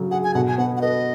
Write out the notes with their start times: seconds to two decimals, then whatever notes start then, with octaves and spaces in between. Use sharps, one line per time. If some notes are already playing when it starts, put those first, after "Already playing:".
Already playing: C#3 F#3
0.11 G#4 F#5
0.24 G#5
0.34 B2 F#5
0.48 G#5
0.58 B3 F#5
0.77 F#5
0.81 B4 D#5